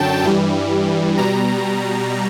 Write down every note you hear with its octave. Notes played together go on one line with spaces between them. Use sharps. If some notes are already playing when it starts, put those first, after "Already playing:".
Already playing: F#2 D3 F#3 G5 A5
G2 E3 G3
B2 G3 A#5